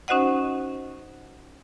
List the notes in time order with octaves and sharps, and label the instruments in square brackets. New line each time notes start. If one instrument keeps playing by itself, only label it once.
[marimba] C#4 D#4 F#4 C5 D#5 F#5